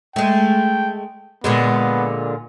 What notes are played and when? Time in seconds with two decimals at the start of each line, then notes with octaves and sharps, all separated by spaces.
0.16 G#3 A3 G5
1.44 A#2 D3 G#3 B3